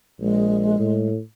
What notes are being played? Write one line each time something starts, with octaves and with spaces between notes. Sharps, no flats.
A#1 G#3
A2